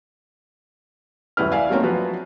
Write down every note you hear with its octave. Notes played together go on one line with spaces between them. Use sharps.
D#1 F#2 E4 B4 F6
D5 E5 F5 G#5
F#3 A3 A#3 C4 C#4 D#4
F3 F#3 B4